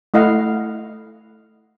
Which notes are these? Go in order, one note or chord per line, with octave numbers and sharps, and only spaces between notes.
A3 E4 D#5 F5 F#5